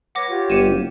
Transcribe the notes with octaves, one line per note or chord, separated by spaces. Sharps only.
B4 C#5 F#5 D6 A#6
F4 G4 C#5
G1 C#7 D#7 E7
F#1